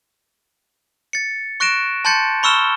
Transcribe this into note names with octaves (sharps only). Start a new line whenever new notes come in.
A6 C#7
C#6 F#6 A#6 D7 E7
A5 C6 G6 A6 C#7
B5 C#6 E6 F6 E7 G7